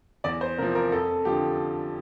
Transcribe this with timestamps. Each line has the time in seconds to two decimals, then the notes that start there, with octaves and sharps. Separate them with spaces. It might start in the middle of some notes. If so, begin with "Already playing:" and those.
0.24 E2 D5
0.41 C5
0.58 C3 F3 A#4
0.75 A#4
0.92 F2 A4
1.25 D3 F3 G4